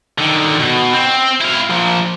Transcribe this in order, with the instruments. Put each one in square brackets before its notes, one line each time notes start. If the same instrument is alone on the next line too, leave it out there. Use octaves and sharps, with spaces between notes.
[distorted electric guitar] D3 D#3
B2
C4
E4 F5
F3 A#3